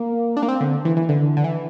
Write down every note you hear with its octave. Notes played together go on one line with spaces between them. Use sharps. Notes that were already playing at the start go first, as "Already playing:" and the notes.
Already playing: A#3
D4
A#3
C4
D3
E3
E3
D3
D3
E3